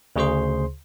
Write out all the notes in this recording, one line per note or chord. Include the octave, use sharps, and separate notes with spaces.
D2 C#3 G#4 C5 C6